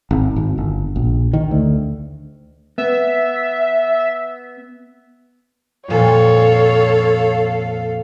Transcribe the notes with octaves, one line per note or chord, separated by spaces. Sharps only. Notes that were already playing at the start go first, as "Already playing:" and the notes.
G#1
G#1
G1
A#1
D#3
D2
B3 E5
F2 A#2 F3 A4 C#5 F5